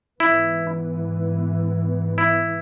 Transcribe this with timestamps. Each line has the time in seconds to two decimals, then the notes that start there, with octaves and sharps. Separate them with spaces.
0.20 G#2 E3 B3 E4
2.18 E4